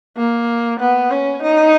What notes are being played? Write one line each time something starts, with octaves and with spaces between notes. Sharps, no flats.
A#3
B3
C#4
D#4